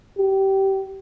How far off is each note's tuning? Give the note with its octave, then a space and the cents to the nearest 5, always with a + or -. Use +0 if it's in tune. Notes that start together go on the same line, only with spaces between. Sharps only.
G4 -20